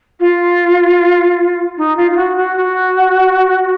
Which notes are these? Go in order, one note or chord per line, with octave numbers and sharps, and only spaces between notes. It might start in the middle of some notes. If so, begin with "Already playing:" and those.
F4
D#4
F4
F4
F#4
F#4
F#4